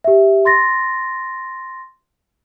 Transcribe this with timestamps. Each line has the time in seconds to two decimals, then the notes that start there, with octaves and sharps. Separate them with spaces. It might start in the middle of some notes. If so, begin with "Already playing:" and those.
0.04 G4 E5
0.45 C6 A6 A#6